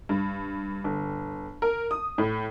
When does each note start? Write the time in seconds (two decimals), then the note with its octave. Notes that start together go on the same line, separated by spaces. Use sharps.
0.09 G2
0.84 G1
1.62 A#4
1.91 D#6
2.18 A2